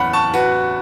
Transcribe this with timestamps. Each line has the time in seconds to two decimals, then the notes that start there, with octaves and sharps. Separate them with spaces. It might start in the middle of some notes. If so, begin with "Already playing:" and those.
Already playing: F#1 E2 E3 C#4 F#5 B5
0.13 A5 C#6
0.33 F#4 B4